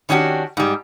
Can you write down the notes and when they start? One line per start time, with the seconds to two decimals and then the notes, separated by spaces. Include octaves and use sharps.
0.09 D#3 C#4 D4 F#4 G4
0.57 G#2 G3